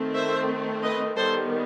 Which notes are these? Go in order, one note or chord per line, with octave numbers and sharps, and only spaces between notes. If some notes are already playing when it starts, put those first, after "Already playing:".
Already playing: D#3 A3 C4
C5 E5
B4 D#5
D#3 G3 B3 A4 C5